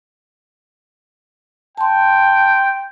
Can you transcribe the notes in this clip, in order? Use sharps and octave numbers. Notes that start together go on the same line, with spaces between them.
G5 A5 C6